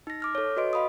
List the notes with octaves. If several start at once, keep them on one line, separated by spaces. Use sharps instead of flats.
D#4 A#6
D6 F6 A#6
A4 C#5
F#4 B4 D#5 C6 D7
D#5 F5 B5 C6 D#6